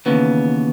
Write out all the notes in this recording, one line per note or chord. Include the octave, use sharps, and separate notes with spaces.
D#2 C#3 E3 B3